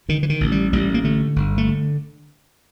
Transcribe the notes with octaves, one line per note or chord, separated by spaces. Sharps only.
D3 D#3
E3
D#3
A1
G3
A1 G3
A#3
D3 A3
G1
A3
D3